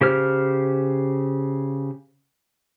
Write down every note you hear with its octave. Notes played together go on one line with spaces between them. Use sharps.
C#3 G4 C5 F6